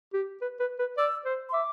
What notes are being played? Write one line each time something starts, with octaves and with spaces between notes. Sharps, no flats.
G4
B4
B4
B4
D5 E6
C5
C6
E5 D6